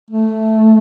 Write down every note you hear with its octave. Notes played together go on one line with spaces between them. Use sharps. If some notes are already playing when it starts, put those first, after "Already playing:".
A3